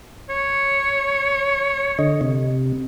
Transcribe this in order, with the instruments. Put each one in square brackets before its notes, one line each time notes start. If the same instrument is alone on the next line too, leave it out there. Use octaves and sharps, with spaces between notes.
[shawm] C#5
[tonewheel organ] D3 D#5
C3